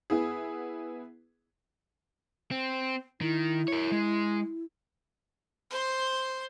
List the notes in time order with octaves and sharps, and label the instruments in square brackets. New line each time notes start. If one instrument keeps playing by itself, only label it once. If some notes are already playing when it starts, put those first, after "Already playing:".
[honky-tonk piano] B3 E4 G#4
[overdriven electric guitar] C4
[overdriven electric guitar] D#3 [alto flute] E4
[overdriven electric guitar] A#4 C#5
G#3
[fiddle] C5 C6